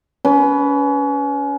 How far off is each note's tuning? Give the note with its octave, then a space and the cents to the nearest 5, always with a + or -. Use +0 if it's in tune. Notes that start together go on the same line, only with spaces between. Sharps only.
C#4 +30 B4 +0